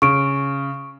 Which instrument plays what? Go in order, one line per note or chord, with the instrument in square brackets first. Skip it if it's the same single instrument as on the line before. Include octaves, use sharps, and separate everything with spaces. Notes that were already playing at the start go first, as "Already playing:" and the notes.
[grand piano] C#3 [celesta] C#6 D7